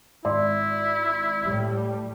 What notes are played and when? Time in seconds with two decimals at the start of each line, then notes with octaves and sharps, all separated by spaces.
0.24 G#1 E4 D5 C6
1.40 A2 G3